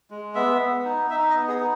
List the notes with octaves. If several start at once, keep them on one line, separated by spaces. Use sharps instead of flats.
G#3
B3 E5
B3
D#4
D#4 E5
D#5
B3
G#4
D#4